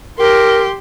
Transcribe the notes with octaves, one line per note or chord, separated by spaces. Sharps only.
G4 A#4 C6